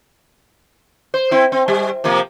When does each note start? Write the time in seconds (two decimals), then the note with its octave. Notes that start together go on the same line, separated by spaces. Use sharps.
1.14 C5
1.31 C4 E4
1.52 C4
1.68 G3
2.04 C3 F3 A#3